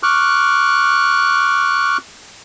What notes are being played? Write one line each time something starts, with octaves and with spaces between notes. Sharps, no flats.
C#6 D6 F6 F#6